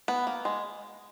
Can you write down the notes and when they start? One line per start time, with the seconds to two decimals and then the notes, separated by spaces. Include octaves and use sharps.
0.08 B3
0.27 A#3
0.45 G#3